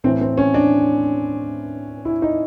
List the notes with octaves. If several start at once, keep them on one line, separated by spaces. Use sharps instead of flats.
A2 E3 C4
C4
C#4
D4
E4
D#4